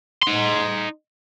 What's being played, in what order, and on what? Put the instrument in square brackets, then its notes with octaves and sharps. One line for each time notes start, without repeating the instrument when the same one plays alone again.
[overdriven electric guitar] D#4 C6